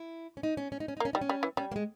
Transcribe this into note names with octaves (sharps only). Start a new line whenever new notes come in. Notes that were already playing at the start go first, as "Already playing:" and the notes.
Already playing: E4
C#4
D#4
C#4
C#4
D#4
C#4
D#4
A#3
C#4
G3 D#4
C#4
G3
E3
G3 C#4
A#3
G#3